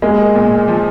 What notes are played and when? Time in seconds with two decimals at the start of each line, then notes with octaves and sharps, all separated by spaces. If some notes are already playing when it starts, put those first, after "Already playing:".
0.02 G#3 A#3
0.35 A#2
0.68 F3